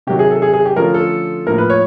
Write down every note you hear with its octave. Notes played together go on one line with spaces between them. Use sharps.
C3 D#3 F#3 G4
G#4
A4
G#4
G#4
G4
D3 F3 A3 C#4 F4 A#4
A4
A2 F3 A#3 A#4
B4
C#5